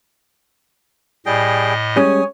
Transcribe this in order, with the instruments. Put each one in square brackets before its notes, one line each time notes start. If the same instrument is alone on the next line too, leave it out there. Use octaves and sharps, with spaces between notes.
[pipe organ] A2 D#5 [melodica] G3 G#4 G5
[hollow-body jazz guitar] G3 G#3 C#4 [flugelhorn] C#5 [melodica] G#5 D#6